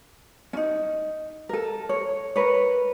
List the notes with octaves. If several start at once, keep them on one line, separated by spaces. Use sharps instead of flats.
C#4 D#4
A4 A#4
C#5
A#4 B4 C#5